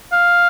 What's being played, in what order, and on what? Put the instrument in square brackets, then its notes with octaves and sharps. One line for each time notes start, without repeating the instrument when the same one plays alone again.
[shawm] F5